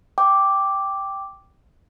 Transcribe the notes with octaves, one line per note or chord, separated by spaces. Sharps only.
G5 D6